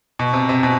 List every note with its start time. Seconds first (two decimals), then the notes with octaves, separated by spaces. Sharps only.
0.19 B2
0.33 C3
0.49 C3
0.63 B2